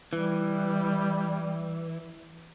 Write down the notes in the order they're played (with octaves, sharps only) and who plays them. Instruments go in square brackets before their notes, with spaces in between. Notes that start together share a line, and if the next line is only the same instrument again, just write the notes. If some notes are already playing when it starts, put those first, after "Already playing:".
[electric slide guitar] E3 [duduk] G3